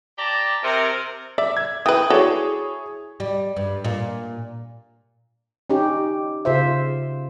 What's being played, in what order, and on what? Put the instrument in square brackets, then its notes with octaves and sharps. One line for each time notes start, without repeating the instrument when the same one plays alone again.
[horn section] G4 D5 A5 A#5
C3 A#4
[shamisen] D5 [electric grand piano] E5
[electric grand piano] G#6
[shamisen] E3 B4 [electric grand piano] G5 D#6
[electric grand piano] E4 G#4 C#5 [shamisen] F#4 A4 D5
[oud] G3
G2
A#2
[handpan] C#4 D#4 G4
C#3 F4 C5 E5